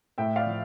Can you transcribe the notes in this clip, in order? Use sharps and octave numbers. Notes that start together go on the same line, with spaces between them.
A2 E5 G5
D5 F5
F3